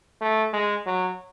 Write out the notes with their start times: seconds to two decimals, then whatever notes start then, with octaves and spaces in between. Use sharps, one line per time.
0.21 A3
0.53 G#3
0.87 F#3